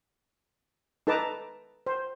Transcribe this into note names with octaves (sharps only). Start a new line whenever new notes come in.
D#4 A4 B4 A5 A#5 D6
C5